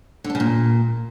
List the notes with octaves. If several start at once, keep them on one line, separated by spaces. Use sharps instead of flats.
D3
D4
C#3
A#2